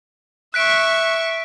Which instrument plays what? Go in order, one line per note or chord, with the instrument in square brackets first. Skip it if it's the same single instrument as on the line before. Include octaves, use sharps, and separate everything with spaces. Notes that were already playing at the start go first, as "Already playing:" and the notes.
[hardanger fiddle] E5 C#6 [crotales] F#6 B6 D7